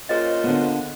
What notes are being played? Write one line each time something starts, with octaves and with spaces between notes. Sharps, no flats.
A#2 C#4 G#4 C5 D#5
D3 B3